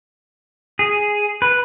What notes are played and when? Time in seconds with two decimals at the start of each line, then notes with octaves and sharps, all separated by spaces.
0.79 G#4
1.42 B4